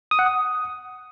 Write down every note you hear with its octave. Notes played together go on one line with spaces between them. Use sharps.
D#6
F#5
D#6